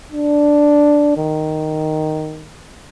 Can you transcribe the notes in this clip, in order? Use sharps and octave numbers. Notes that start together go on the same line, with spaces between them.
D4
D#3